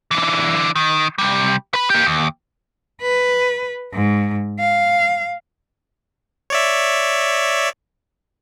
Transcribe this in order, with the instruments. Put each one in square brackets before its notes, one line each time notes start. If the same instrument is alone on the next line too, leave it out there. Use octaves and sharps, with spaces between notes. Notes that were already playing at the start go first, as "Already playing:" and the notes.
[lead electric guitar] E3 D4
D#3
C3 G3
B4 B5
A#3 G4
D#2
[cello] B4
G#2
F5
[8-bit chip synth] C#5 D5 E5